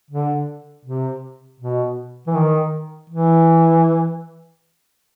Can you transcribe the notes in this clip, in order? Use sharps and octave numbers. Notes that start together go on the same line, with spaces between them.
D3
C3
B2
E3
D#3
E3